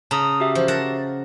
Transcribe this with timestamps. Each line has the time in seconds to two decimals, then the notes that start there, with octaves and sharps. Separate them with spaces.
0.11 C#3 A5 A#5 D#6
0.40 F#4 G4 E5
0.55 F3
0.68 A#4 F#5 A5